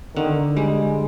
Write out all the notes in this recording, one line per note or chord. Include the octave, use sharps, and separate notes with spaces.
D3 D#3
G3 G#3